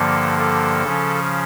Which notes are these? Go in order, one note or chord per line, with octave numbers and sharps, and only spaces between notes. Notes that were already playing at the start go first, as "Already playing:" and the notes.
Already playing: G2 D3 F3 A#3 A4
A4
C#3 F3 C#4